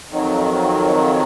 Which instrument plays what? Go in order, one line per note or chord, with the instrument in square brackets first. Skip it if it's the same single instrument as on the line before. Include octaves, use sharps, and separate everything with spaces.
[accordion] F2 D#3 F#3